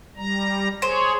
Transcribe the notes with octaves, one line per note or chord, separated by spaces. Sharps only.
G3 A#5
G#4 C5 C#5